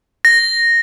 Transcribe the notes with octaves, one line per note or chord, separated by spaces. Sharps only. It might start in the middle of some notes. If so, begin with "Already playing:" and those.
A#6